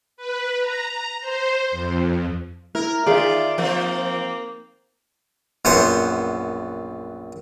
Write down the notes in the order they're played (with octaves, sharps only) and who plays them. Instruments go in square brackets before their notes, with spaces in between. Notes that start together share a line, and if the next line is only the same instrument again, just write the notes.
[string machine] B4
A#5
C5
F2
[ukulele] E4 [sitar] A#4
[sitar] D#3 [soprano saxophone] F4 [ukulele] G#4 E5 [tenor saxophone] D5
[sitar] F3 [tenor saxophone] A#3 [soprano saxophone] C4
[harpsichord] A#1 F#2 B3 C5 F#5 C6